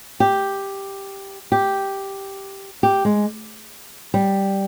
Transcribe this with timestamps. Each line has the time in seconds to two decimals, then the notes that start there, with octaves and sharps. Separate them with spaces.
0.20 G4
1.52 G4
2.83 G4
3.05 G#3
4.14 G3